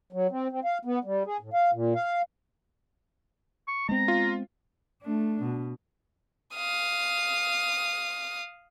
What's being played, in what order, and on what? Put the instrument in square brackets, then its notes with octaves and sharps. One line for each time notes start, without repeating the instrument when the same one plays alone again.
[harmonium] F#3
C4
C4
F5
B3
G3
G#4
A2
F5
A#2
F5
[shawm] C#6
[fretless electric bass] G#3 B3 C4 [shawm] A#5
[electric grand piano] F4
[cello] A3 D4
B2
[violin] F5 D#6